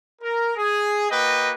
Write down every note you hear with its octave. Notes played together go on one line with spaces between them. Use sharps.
A#4
G#4
A#3 F#4 B4 D#5 G5